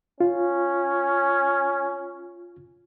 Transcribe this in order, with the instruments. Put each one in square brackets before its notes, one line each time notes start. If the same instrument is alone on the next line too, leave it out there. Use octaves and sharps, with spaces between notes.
[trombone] C#4 [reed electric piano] F4